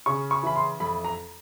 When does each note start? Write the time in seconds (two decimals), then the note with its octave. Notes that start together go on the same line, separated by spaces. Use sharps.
0.06 C#3 C#6
0.31 C#6
0.43 E3 B5
0.56 C6
0.80 F2 B5
1.05 A#5